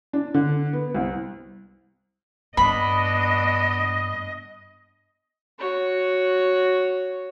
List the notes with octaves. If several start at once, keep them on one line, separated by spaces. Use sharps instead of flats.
D4
D3
B3
C2
G2 B3 D4 D#5 B5
F#4 C#5